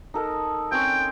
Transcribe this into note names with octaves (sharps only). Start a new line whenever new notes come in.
D#4 A4 A#4
C4 C#4 C#5 G5